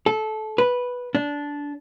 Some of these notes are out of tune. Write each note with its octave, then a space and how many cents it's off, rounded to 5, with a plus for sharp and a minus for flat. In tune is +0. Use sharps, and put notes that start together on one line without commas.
A4 -20
B4 -5
D4 -15